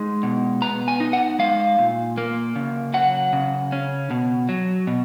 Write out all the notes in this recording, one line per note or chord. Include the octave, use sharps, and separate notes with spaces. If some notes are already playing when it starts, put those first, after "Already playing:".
Already playing: G#3 D#4
B2
B3 A#5
G#5
D#4
F#5
G#3 F5
A#2
A#3
C#3
F#3 F#5
C#3
C#4
B2
F#3
B2